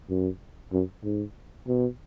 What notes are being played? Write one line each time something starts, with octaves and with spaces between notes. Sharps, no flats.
F#2
F#2
G#2
B2